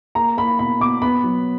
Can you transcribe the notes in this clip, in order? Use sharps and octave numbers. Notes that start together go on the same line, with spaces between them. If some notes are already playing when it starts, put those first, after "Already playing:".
A#3 A#5
A#3 B5
B2 B5
B2 D6
B3 B5
F#3